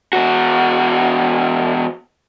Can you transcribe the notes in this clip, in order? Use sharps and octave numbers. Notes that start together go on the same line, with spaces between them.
E2 F#4